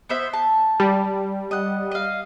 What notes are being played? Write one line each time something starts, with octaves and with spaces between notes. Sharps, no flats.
B3 C5 E5
A5
G3
D#5 F#5
D#5 F5